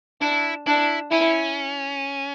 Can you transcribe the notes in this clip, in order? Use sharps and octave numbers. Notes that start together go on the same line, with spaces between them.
D4 E4
D4 E4
C#4 E4